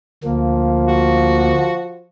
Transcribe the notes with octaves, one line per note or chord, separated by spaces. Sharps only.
D2 F3 A#3
F#4